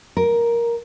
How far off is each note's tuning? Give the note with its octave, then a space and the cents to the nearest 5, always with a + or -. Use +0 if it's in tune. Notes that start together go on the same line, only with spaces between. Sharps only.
A#4 +10